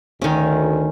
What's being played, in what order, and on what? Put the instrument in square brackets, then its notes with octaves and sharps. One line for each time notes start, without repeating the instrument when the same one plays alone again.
[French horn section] D2 [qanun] D#3 C#4